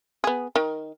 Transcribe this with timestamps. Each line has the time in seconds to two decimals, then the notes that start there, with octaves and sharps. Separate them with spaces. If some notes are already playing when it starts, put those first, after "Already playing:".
0.24 B3 G#4
0.55 D#3